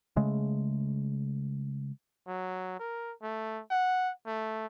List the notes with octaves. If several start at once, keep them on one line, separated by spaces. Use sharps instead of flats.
C#3 G#3 A3
F#3
A#4
A3
F#5
A3